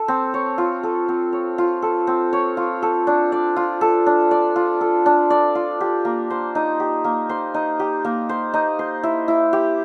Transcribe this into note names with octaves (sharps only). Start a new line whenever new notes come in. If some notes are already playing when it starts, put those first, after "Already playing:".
Already playing: A4
C4
C#5
F4
A4
C4
C#5
F4
A4
C4
C#5
F4
A4
D4
D5
F4
A4
D4
D5
F4
A4
D4
D5
F4
G4
A#3
C5
D#4
G4
A#3
C5
D#4
G4
A#3
C5
D#4
C5
E4
E4
G4